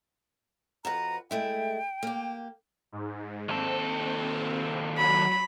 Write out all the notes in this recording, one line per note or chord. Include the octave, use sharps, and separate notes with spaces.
F2 F#4 B4 A#5
G#3 A3 E4 G5
A#3 G4
G#2
D#2 C4 A4
F#3 B5